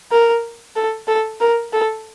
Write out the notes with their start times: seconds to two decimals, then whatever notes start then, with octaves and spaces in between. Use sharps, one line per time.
0.12 A#4
0.76 A4
1.08 A4
1.41 A#4
1.73 A4